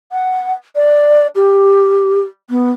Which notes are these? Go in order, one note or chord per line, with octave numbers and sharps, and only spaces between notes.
F#5
D5
G4
B3